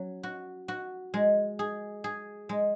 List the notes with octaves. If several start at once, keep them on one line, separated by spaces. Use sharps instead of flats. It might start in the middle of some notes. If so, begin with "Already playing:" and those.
Already playing: F#3 C#4
F#4
F#4
G#3
G#4
G#4
G#3